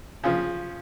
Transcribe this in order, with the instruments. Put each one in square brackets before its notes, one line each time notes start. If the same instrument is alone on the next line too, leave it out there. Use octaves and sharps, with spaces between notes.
[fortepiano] C#3 F3